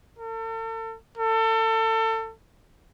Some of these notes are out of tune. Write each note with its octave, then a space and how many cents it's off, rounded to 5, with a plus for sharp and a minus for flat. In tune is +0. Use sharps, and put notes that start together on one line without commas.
A4 +40
A4 +30